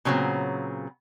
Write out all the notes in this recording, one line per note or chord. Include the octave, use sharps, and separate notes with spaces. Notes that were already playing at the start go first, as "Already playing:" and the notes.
A#2 C#3 F#3 B3 C4